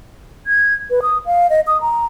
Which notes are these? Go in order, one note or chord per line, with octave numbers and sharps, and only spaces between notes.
G#6
B4
D#6
F5
D#5
D#6
A#5